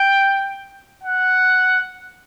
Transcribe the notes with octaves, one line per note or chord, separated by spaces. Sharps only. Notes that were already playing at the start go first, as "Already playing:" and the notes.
Already playing: G5
F#5